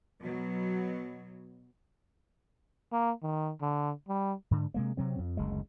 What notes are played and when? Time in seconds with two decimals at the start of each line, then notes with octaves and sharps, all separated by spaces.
0.19 B2 F#3
2.93 A#3
3.23 D#3
3.61 D3
4.08 G3
4.51 G#2 D3
4.74 C3 G#3 A#3
4.97 C3 F#3 C4
5.19 F2
5.37 F#1 D2 G#3